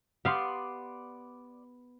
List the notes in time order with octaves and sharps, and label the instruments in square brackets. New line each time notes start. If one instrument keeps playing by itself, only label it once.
[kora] B3 [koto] G4 F5 [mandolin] D5 C6